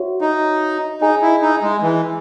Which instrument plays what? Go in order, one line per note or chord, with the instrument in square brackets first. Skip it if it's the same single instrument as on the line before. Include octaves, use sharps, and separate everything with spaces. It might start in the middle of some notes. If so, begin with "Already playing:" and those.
Already playing: [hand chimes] F#4 C#5 E5
[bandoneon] D#4
[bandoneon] D#4 [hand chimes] G#4 D#5 G#5
[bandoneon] E4
D#4
G#3
E3